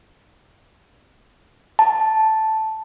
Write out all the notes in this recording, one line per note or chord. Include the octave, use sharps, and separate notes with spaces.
A5